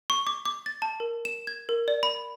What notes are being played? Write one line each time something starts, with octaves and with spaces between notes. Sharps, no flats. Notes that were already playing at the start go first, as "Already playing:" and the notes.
C#6
D6
D6
A6
A5
A#4
E7
G#6
A#4
D5
B5